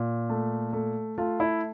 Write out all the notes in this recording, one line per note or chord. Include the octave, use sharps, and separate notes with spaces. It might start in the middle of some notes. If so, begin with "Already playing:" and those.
Already playing: A#2
A3
A3
A3 F4
E4